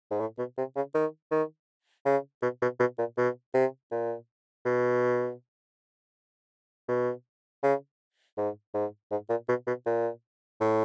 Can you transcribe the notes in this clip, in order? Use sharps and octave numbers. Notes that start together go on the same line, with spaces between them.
G#2
A2
B2
C3
C#3
D#3
D#3
C#3
B2
B2
B2
A#2
B2
C3
A#2
B2
B2
C#3
G#2
G#2
G#2
A#2
B2
B2
A#2
A2